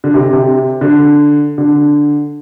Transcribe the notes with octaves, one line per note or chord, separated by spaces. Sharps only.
D3
C3
D3
C3
D3
D3